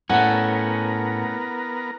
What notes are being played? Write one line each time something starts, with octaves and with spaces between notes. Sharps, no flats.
A2 A3 B3 C#4 A#4 F#5